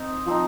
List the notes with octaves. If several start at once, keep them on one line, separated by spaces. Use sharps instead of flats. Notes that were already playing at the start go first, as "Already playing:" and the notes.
Already playing: C4 D#4
F3 C4 D#4